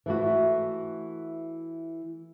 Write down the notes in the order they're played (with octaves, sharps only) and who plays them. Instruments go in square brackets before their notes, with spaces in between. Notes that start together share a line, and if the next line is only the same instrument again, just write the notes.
[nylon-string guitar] E3 A3 F#4